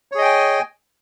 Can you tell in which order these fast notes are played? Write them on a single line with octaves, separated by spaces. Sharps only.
C#5 G#4 D#5 G5 G#5